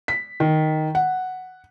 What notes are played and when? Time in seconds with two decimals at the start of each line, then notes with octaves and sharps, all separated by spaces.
0.08 B6
0.40 D#3
0.95 F#5